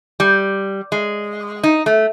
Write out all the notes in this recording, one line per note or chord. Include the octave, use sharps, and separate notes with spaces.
G3
G#3
D#4
A3